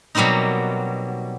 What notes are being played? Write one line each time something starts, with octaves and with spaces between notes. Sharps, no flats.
B2 F#3 G3 A#3 C4 D#4